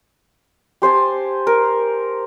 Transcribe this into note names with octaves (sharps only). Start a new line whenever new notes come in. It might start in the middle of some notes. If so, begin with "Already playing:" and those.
G4 C5 G#5 A5
A#4